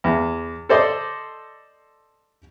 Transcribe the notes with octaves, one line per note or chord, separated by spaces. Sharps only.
E2
A4 C5 D5 D#5 C6